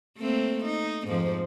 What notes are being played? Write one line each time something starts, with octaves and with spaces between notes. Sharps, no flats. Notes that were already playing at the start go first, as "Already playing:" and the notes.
A3 A#3 C4
D#4
F2 G#2 F3